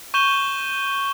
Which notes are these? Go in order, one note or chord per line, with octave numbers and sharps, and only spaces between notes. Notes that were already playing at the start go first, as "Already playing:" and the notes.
C#6 G6 E7 G7